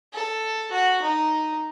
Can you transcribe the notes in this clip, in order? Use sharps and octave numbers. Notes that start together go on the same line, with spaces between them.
A4
F#4
D#4